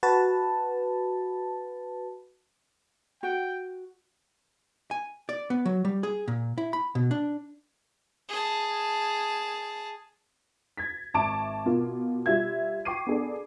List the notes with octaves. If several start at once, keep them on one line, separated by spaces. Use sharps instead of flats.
F#4 B4 A5
F#4 G5
G#5
D5
B3
F#3
G3
G#4
A#2
E4
B5
B2
D4
G#4 A5
G#6 A6 B6
G#1 E5 A5 C#6 D6 D7
B2 F4 A#4
G3 F4 E5 G#6
G5 C#6 D6 C7 D#7
B3 D4 G#4 A4 D5